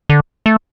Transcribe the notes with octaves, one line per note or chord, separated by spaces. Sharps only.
D3
A3